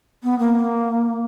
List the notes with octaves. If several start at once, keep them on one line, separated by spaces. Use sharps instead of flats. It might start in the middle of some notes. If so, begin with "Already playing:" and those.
B3
A#3